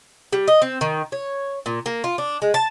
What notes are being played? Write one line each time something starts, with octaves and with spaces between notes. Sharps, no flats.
G3
D#5
C4
D#3
C#5
A#2
A#3
F4
D4
G#3
A5